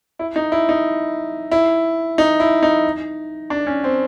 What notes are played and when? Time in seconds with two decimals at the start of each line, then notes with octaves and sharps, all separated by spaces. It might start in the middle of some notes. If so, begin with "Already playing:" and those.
0.19 E4
0.36 D#4
0.52 E4
0.69 D#4
1.51 E4
2.18 D#4
2.40 E4
2.63 D#4
3.50 D4
3.67 C#4
3.84 C4